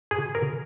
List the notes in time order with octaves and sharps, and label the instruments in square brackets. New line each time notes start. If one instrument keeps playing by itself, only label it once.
[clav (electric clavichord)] G#4
A#4